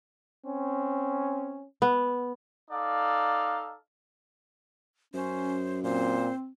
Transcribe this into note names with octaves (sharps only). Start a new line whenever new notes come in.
C4 C#4
B3
D#4 A4 D5 F5
F#2 C#4 C5
A#2 C4 C5